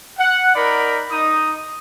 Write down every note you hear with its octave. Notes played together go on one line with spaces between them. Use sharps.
F#5
D#4 A#4 D5 B5
D#4 D#6